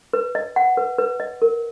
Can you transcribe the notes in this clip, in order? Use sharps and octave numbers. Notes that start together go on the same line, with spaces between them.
B4
D#5
F#5
B4
B4
D#5
A#4